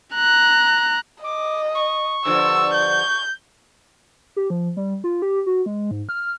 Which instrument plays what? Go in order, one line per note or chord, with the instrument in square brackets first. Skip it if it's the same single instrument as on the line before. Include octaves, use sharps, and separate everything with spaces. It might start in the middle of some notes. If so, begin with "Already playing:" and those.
[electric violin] A#5 F#6
[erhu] D#5 [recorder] D6
[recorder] C#6
[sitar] G2 D3 F3 [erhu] E6
[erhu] G6
[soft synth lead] G4
F3
G3
F4
G4
F#4
G#3
G#2
F6